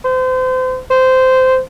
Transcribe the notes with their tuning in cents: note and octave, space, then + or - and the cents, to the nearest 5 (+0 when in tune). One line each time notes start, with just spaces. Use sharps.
C5 -35
C5 -15